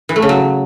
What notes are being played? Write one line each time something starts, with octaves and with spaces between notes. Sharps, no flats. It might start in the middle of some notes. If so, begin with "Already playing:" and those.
E3
A3
C#3
F#3